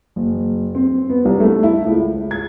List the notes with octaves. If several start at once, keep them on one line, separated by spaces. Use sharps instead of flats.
F#1
C4
B3
C2
A3
E4
C#2
G#6